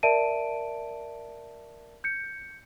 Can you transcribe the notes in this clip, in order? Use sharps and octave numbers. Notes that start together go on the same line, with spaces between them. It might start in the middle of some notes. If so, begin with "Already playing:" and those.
A#4 D5 E5 A5 D7 D#7
G6 C#7